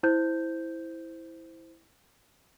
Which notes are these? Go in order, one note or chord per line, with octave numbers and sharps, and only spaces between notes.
E4 C5 G6